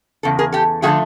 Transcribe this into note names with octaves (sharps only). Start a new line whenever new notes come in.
E2 C#3 A4
G#4 A#4
G4 A4
D3 F3 A3 F#4 G#4